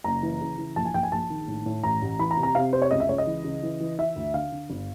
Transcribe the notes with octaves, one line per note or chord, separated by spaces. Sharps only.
F#1 A#5
E3
C#3
E3
A#1 A5
G#5
A#1 G5
G#5
A#1 A5
D#3
A2
A2
A1 A#5
A1
E3 B5
A#5
C3
A#5
C3 F5
C3 C5
C#5
C#2 D#5
E5
C#2 C#5
D#5
E3
C#3
E3
E3
E3 E5
D2
D3 F5
D3
G1